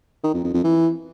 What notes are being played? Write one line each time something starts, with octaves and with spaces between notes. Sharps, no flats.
D#3
F2
F2
F2
E3